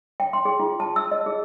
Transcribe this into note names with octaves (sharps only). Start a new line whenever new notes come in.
G5
C6
G#4
F4
A5
E6
D#5
G#4